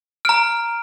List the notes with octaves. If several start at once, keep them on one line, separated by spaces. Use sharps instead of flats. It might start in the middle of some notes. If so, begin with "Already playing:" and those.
A#5 F6 D7